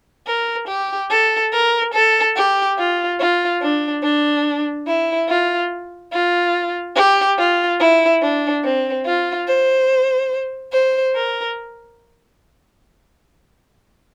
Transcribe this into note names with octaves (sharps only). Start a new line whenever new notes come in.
A#4
G4
A4
A#4
A4
G4
F4
F4
D4
D4
E4
F4
F4
G4
F4
E4
D4
C4
F4
C5
C5
A#4